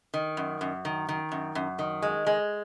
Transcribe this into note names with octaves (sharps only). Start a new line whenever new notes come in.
D#3
F#2
F#2
D#3
D#3
F#2
F#2
D#3
G#3
G#3